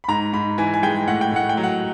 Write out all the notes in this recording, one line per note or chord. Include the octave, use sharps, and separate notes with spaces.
B5
G#2 A#5
G#2 B5
E3 G#5
G#5
G#3 G5
A2 F#5
G5
A2 F#5
G5
F#3
F#5